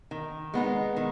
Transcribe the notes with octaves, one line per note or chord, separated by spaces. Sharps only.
D#3
G#3 B3 D#4
D#3